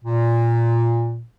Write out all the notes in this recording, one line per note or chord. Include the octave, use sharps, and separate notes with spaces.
A#2